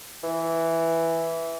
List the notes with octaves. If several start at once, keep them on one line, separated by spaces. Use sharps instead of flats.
E3